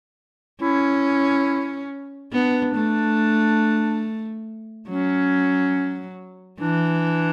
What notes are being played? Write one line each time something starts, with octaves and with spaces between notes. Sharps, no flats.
C#4 E4
B3 D4
A3
F#3 C#4
E3 D4